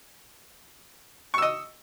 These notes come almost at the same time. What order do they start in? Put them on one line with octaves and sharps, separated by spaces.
C#6 E6 D#5